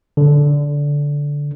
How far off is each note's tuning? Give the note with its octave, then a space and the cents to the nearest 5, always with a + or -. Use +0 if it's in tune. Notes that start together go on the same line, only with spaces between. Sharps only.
D3 -15